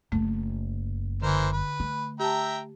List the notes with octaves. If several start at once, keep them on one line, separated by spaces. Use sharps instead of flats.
F#1 F#2 A3
D3 E3 A#4 C5
B4
A3
G4 E5 G5 A5 A#5